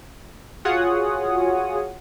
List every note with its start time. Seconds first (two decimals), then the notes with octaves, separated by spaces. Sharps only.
0.65 F4 F#4 G#4 C#5 F#5 D#6